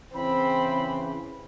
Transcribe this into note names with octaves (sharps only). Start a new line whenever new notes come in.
C#3 E3 C4 B5